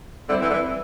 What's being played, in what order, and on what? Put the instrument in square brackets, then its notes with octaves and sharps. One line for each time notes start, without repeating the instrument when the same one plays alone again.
[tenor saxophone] D3 [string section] G3 C4 E4
[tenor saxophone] E3
D3
E3